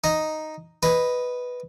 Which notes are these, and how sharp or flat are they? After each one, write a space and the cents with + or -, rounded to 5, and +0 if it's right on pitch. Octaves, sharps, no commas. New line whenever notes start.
D#4 +0 D#5 +0
B4 +0 D#5 +0